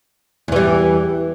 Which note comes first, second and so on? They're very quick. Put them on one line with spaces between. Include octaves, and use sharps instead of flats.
E2 E3 G3